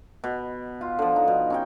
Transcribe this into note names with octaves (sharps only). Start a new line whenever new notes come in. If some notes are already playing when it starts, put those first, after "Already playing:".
B2
F4
D3 F3
D#4
B2
C#4 D#4 G5